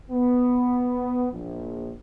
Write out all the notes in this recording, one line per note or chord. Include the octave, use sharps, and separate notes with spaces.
B3
A#1